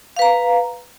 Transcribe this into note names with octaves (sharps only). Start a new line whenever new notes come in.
B4 F5 A#5